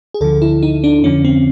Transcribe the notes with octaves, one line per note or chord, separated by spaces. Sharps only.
G#4
D2 D3 F3 A4
E4
D#4
D4
F2 D3 F3 C#4
C4